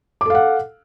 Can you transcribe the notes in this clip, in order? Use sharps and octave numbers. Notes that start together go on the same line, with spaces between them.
A4 F5 F#5 D6